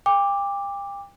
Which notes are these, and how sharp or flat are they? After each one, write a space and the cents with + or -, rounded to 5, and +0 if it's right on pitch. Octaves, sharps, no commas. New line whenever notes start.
G5 +35 D6 +0